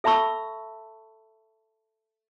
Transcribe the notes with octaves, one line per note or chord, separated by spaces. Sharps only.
A4 E5 A5 B5 C#6 E6